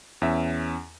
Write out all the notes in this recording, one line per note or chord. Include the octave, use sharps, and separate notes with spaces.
E2 C#4 E5